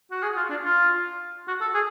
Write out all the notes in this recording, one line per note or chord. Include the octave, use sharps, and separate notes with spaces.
F#4
G#4
F4
D4
F4
F#4
A4
G#4